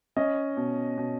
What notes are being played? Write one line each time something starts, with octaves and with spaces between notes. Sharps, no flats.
C#4 D#5
B2
B2